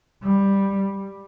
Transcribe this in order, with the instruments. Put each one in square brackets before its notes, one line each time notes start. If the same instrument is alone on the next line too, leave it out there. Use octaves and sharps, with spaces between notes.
[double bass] G3